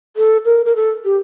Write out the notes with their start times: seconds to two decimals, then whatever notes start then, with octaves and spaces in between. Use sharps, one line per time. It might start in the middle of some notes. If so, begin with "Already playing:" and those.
0.17 A4
0.45 A#4
0.65 A#4
0.76 A4
1.05 G4